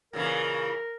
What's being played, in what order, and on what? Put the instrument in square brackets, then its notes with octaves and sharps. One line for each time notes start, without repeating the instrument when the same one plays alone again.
[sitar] A#2 C#3 E3 [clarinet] A#4